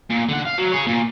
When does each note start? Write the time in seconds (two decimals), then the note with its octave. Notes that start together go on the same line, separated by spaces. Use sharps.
0.10 A#2
0.29 D3 F#5
0.45 F5
0.58 F#3
0.72 G#4 C#5
0.87 A#2